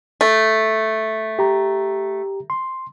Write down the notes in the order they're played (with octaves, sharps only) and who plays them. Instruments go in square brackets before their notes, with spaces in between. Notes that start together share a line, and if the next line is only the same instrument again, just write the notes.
[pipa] A3
[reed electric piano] G4 A#5
C6